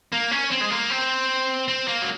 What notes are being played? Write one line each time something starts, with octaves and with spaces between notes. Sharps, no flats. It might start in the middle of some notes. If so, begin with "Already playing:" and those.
A#3
C#4
C4
G#3
A#3
C4
C4
A#3
F#3